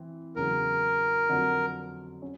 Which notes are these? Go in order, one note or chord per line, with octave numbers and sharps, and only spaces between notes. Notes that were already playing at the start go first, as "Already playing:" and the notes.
Already playing: E3 C4
E2 C#3 F#3 A#4
F2 D3 F#3
C#4